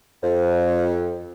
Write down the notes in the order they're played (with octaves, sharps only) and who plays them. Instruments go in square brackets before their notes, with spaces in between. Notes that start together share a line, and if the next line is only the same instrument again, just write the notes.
[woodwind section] F2